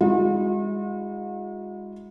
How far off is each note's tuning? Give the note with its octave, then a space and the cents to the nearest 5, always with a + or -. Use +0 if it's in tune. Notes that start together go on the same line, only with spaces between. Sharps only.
G#3 -30 D#4 +45 F#4 -45